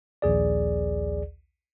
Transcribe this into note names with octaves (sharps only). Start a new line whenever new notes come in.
A#1 D#2 G#4 D5